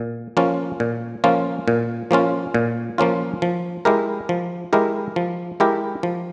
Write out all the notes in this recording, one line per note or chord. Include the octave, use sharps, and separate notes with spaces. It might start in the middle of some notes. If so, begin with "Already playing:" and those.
Already playing: A#2
F3 A#3 C#4 F4
A#2
F3 A#3 C#4 F4
A#2
F3 A#3 C#4 F4
A#2
F3 A#3 C#4 F4
F3
G#3 E4 G4 A#4
F3
G#3 E4 G4 A#4
F3
G#3 E4 G4 A#4
F3